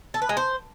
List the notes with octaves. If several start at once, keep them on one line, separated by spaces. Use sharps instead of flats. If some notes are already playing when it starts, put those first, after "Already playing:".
A4
B4
G#3
C5